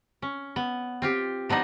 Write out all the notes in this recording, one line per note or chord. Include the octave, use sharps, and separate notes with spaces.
C#4
B3
C4 F4 G4
F3 B3 D4 D#4